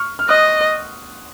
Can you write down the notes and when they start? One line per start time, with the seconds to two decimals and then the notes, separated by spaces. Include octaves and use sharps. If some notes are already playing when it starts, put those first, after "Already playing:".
Already playing: C#6 F6
0.19 F6
0.29 D#5 D#6 F#6